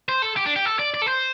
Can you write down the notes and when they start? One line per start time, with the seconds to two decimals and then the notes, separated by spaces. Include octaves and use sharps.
0.09 C5
0.22 A4
0.36 G4
0.46 D4
0.56 G4
0.65 A4
0.79 D5
0.94 D5
1.02 A4
1.08 C5